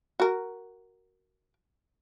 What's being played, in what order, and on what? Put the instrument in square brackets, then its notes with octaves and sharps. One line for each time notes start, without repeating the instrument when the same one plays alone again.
[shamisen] F#4 A#4